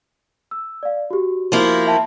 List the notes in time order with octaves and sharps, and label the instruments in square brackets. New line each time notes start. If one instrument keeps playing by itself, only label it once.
[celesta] E6
D5 F5
F#4 G4
[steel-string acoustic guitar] F3 A#3 E4
[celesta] E5 G5 A5